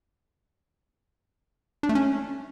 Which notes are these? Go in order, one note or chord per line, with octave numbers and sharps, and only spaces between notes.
D4
A3
C#4